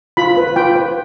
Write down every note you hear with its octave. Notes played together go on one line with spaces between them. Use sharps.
F4 B5
B4
F4 G5
B4